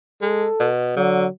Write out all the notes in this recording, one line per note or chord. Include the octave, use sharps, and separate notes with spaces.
G#3 A4
B2
D3 F#3